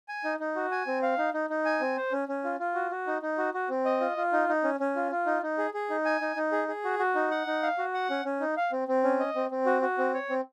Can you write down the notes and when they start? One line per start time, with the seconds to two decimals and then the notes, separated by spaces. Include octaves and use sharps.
0.08 G#5
0.24 D#4
0.40 D#4
0.56 F#4
0.71 G#5
0.87 C4
1.02 F5
1.18 D#4
1.34 D#4
1.50 D#4
1.65 G#5
1.81 C4
1.97 C5
2.12 C#4
2.28 C#4
2.44 F4
2.59 F4
2.75 F#4
2.91 F#4
3.07 D#4
3.22 D#4
3.38 F#4
3.54 F#4
3.69 C4
3.85 D#5
4.00 F4
4.17 F4
4.32 D#4
4.49 D#4
4.64 C#4
4.80 C#4
4.96 F4
5.12 F4
5.26 D#4
5.42 D#4
5.58 G#4
5.74 G#4
5.90 D#4
6.05 G#5
6.21 D#4
6.36 D#4
6.52 G#4
6.68 G#4
6.84 F#4
6.99 F#4
7.15 D#4
7.31 F#5
7.47 D#4
7.63 F5
7.78 F#4
7.94 F#5
8.10 C#4
8.25 C#4
8.40 D#4
8.57 F5
8.72 C4
8.88 C4
9.04 C#4
9.20 D#5
9.35 C4
9.51 C4
9.66 F#4
9.82 F#4
9.98 C4
10.14 C#5
10.30 C4